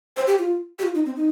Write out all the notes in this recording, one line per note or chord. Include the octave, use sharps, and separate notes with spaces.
C5
G4
F4
G4
F4
D#4
C4
D#4